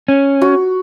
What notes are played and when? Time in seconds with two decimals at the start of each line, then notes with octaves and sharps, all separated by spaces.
0.08 C#4
0.42 F#4